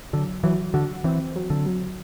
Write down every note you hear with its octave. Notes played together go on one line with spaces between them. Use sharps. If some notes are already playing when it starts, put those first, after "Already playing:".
D3 F#3
E3 F#3
D3 F#4
E3 C4
F#3
D3
F#3